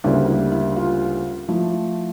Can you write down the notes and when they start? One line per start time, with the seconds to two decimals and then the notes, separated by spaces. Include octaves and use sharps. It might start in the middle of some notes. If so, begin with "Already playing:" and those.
0.04 D2 C#3 G3 A#3 E4
0.28 E4
0.52 E4
0.76 F4
1.49 F3 A3 E4